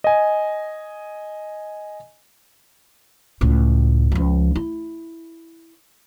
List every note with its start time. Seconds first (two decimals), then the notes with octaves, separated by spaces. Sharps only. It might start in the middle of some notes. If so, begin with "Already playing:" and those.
0.04 D#5 G#5
3.41 C#2 A2
4.12 C#2 F3
4.55 E4